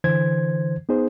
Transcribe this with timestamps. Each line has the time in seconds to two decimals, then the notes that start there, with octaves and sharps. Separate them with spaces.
0.04 D3 E3 C5 G#6
0.89 B3 D#4 G#4 C5